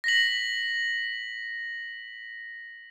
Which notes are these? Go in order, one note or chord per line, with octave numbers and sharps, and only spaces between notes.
A#6 B6 F#7